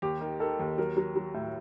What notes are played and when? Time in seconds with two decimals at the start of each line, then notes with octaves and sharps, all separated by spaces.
0.02 D#2 G4
0.21 D#3
0.40 D#3 A4
0.59 D#2
0.78 F#3 A#4
0.97 F#3
1.16 F#3
1.34 A2